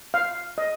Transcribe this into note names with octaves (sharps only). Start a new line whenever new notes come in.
F5
D#5